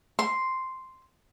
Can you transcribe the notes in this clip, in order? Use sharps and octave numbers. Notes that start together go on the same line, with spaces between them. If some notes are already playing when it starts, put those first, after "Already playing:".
C6